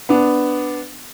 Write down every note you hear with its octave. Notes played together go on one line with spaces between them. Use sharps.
B3 D4